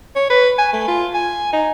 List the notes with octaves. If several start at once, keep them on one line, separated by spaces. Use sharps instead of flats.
C#5
B4
G#5
A3
F4
G#5
D#4